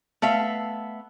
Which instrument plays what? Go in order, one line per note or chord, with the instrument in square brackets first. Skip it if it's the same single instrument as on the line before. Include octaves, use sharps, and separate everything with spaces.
[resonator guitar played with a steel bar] A3 B3 E5 F5